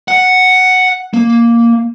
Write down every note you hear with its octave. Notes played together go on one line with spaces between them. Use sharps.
F#5
A#3